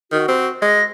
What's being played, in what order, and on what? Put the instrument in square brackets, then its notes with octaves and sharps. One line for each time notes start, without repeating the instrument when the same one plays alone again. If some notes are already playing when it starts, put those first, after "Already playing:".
[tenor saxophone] D#3 [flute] F#4
[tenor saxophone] C4
[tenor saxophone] G#3 [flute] A#6